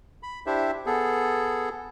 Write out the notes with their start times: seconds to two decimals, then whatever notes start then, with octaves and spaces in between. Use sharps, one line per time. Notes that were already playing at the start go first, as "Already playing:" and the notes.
0.23 B5
0.46 D4 E4 G4 C5 E5
0.86 B3 G#4 A4